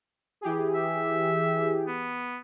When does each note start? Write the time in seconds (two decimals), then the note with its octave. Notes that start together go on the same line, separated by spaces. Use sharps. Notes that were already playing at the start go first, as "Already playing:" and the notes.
0.41 E3 G4 G#4
0.75 E5
1.88 B3